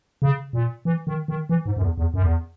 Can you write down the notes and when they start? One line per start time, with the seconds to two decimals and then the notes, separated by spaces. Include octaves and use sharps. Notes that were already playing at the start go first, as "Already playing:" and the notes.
0.22 C#3
0.53 A#2
0.85 E3
1.07 D#3
1.28 D#3
1.49 E3
1.66 G#2
1.77 F#2
1.82 E2
1.98 E2
2.14 F#2
2.23 E2